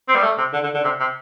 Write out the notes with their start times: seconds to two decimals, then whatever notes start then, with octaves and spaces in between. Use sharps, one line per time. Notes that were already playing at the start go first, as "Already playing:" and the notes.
0.08 C4
0.16 G3
0.24 A3
0.38 C3
0.53 D3
0.64 D3
0.74 D3
0.84 C3
1.00 C3